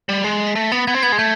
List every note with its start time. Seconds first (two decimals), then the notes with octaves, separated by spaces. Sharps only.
0.09 G3 A6
0.24 G#3 C7
0.47 B6
0.55 A3 A#6
0.72 B3 A6
0.87 B3 G#6
0.94 C4
1.03 B3 G#6
1.12 G#3
1.18 A3 G6